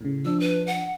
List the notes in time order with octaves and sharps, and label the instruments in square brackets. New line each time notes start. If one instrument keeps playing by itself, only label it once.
[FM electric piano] A2 C#3
[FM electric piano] F3 D4 [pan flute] E6
[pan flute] B4
F#5